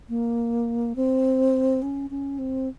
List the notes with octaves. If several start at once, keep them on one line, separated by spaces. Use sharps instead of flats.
A#3
C4
C#4
C#4
C4